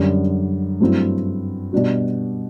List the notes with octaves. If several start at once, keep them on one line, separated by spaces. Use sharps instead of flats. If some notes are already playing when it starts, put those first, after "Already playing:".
Already playing: F#2 D3 G3 D4
G2 F#3 A3 C4 E4
B2 G3 D4 F#4